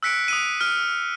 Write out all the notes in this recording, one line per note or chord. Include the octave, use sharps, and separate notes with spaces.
E6 F#6 B6 C#7 D7
D#6 E6 D#7
F6